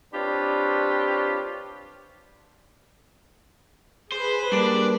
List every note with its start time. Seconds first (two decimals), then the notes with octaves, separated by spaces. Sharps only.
0.13 C4 D4 F4 G4 B4 C#5
4.12 G#4 B4 C5
4.52 G3 A#3 D4 A#4 D5 A5